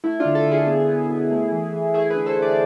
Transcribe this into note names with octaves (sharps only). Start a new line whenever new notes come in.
A3 E4
D4 F4
D3
F4 A4
D3
E4 G#4
B3
B3
B2
A3
E3
E3
A3 E4 G#4
G#4 B4
D3
A4 C5
D3
B4 D5